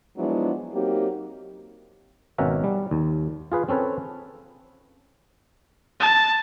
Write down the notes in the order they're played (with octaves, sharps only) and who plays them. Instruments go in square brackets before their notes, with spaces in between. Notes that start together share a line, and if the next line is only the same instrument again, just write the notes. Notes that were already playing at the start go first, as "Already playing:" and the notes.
[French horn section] F3 F#3 G#3 B3 D4 E4
F#3 A#3 C4 D#4 G4
[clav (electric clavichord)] G#1 B2 C#4 A#4 E5 F#5
G3
D#2
F4 G#4 B4 F5
C4 C#4 A4 B4 C#5
[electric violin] A5